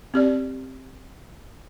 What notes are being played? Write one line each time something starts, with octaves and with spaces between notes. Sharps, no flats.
C4 G4 D5